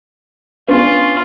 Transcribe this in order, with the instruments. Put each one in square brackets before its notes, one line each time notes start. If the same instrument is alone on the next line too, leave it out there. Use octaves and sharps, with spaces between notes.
[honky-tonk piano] B3 C#4 D4 [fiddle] F4